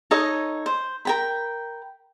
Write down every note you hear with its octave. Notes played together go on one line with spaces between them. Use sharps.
D#4 A4 C#5 D#5
C5
A#4 G5 B5